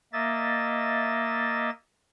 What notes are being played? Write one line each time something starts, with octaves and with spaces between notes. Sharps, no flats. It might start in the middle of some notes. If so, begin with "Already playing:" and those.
A#3 D#5 E5 A6